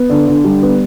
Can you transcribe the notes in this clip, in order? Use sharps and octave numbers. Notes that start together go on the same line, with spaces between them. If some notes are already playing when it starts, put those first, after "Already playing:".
Already playing: B3
D3
D3
G3
B3